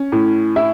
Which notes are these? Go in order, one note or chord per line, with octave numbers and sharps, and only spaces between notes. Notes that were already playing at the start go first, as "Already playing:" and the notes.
Already playing: C#4
A2
E4